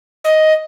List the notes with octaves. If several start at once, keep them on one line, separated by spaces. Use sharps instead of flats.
D#5